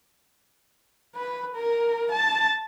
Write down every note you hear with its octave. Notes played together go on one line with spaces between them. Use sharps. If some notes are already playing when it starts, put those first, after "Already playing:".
B4
A#4
A5